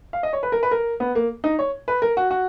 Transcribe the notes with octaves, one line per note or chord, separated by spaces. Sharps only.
F5
D#5
C#5
B4
A#4
B4
A#4
B3
A#3
D#4
C#5
B4
A#4
F#4
F#4